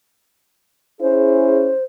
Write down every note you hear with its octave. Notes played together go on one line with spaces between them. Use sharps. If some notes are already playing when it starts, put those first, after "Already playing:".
C#4 E4 G#4 C5